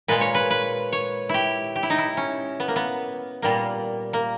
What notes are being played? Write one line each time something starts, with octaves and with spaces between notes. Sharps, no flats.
A#2 G#3 B4
C#5
B4
B4
C#5
E4 G4
G4
E4
D#4
E4
C#4
B3
A#3
B3
A#2 G3 A#3
A#3